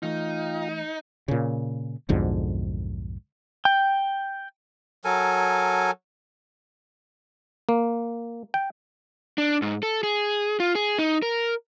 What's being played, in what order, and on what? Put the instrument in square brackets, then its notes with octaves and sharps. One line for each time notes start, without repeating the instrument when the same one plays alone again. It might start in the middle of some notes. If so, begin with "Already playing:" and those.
[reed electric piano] E3 A3 [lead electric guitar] D#4 [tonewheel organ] F4 F5 G5
[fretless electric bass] A#2 C#3
B1 F2 G#2 D3
[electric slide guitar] G5
[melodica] F#3 A4 A#4 G#5
[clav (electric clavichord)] A#3
G5
[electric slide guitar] D4
G#2
A4
G#4
F4
G#4
D#4
A#4